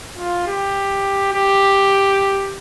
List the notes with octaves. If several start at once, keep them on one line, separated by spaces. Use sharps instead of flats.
F4
G4
G4